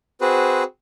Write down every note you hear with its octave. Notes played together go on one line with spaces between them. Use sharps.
C4 F#4 G#4 B4 C5